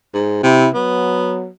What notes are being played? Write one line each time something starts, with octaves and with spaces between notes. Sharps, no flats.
G#2
C3 E4
F#3 B3